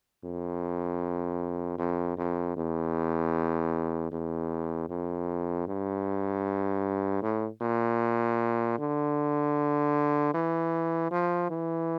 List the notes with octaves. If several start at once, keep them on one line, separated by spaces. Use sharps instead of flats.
F2
F2
F2
E2
E2
F2
G2
A2
A#2
D3
E3
F3
E3